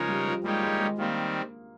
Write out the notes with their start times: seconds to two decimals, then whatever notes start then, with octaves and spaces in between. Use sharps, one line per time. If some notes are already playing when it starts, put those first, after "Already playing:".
Already playing: C#3 F3 G#3 D#4 A#4 C#5
0.08 G3
0.27 F3
0.44 G3 G#3 A#3 D#4 G4 C#5
0.62 G#3
0.80 G#3
0.98 D#3 G3 A#3 C4